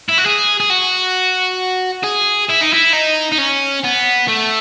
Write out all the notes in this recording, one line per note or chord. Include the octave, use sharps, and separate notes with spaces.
E4
F#4
G#4
G#4
F#4
G#4
E4
D#4
E4
D#4
D#4
C#4
B3
A3